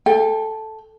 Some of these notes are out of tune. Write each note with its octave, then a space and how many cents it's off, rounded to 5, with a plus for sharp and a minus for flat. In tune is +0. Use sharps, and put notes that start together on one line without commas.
A4 -5 G5 +30